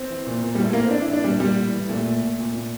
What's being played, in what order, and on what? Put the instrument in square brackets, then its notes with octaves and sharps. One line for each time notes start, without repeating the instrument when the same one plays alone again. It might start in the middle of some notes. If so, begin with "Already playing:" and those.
Already playing: [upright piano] C4
E3
A#2
A#2
A2 G3
A3
E3 A#3
C4
A2 D4
E4
E3
D4
A#2 G3
A#2 G3
A2
E3
A#2 A3
A#2
A#2
A#2
A#2